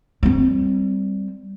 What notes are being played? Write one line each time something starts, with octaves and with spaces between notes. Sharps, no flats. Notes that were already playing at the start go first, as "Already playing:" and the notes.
G3 C4